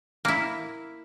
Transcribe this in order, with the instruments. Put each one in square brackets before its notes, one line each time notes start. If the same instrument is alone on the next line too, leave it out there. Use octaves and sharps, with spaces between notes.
[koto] A#3 E4